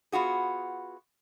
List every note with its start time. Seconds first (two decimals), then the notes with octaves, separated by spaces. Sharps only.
0.12 B3 F4 F#4 G#4